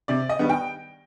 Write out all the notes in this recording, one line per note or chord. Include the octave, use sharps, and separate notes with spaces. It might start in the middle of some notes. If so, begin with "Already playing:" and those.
C3 D5
D#5
D#3 G3 B3
G5